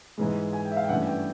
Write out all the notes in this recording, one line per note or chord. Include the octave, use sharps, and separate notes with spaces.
G#2 E3 G#3
G#5
G5
E5
F5
G5
G2 E3 A3 C#4 F#5
G5